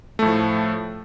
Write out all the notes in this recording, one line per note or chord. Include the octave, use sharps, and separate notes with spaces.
A2 F3 A3